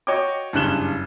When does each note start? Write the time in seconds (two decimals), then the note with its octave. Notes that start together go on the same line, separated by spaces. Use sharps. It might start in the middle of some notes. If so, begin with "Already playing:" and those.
0.07 F#4 C#5 D#5 G5 D6
0.53 F#1 G2 C#3 F#6 E7 G7